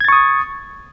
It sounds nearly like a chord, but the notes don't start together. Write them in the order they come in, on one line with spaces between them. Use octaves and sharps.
G#6 A6 C#6 D#6